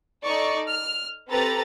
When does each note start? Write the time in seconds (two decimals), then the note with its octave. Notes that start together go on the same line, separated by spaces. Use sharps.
0.23 D#4 A4 D5 C#6
0.68 F6
1.29 C4 G4 A4 B4 A#5 A6